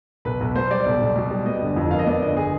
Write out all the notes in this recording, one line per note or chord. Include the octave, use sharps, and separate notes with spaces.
B1 B4
B1
B2 C5
G3 D5
B1
B1
B2
G3
B3 D#5
G1
F2
D#3 F5
D#5
B3 D5
G1 D#5
G#4